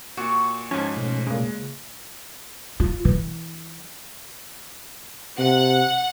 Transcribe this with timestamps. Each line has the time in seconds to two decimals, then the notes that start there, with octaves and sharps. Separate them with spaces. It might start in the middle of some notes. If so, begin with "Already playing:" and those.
0.17 A#2 F#4
0.71 G#2 F3 C#4 A5 G#6
0.97 B2 A3
1.27 A#2 C#3 G#3
2.80 F4
3.05 E3
5.38 C3 F#5